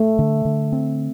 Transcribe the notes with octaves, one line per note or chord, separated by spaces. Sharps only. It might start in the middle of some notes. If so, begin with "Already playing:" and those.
Already playing: A3
D3
D3
C4